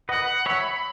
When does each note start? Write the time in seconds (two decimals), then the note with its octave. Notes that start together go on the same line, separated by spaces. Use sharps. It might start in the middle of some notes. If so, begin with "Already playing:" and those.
0.09 B4 D#5 F#5
0.46 C#5 E5 B5